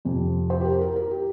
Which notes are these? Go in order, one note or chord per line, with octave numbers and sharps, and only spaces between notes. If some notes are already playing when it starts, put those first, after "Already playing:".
F2 C3 F3
C5
G4
A#4
A#4
A#4
G4